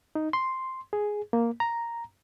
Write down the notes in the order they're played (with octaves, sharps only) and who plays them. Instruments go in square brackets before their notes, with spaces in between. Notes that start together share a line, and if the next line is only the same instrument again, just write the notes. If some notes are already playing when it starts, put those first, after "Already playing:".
[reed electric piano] D#4
C6
G#4
A#3
A#5